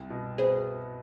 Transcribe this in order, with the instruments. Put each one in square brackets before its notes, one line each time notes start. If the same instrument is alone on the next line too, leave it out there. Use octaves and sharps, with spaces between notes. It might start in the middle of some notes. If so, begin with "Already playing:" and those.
Already playing: [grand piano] C2
B2
[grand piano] B3 [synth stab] G#4 C5